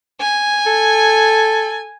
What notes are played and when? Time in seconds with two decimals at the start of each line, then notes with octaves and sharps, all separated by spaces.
0.21 G#5
0.67 A4